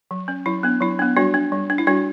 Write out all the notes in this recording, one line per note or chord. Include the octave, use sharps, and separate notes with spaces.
F#3
C#4
F#3 E4
B3 D4
F#3 E4
B3 D4
G3 D4 F#4
D4
G3
D4
E4
G3 D4 F#4